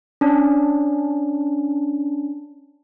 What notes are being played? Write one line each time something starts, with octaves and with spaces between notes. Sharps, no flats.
C#4 D4